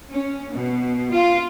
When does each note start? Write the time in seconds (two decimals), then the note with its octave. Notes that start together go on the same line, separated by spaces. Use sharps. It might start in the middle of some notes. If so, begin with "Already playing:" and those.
0.10 C#4
0.52 B2
1.12 F4